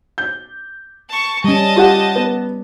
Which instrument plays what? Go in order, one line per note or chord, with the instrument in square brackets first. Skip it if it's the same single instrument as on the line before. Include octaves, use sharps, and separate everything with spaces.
[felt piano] G6
[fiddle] A5 C#6
[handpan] G3 C#4 [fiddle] D#5 A5
[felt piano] F4 G4 F#5
B3